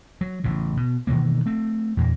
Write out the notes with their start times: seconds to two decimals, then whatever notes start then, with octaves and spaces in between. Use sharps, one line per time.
0.21 F#3
0.44 A1 A2 C#3
0.77 B2
1.07 B2 D#3 E3 A#3
1.46 A3 C4
1.97 E2 A#2 A#3